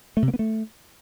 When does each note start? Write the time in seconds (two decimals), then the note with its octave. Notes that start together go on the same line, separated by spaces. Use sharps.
0.17 A3
0.22 C3
0.28 A#3
0.34 B3
0.39 A3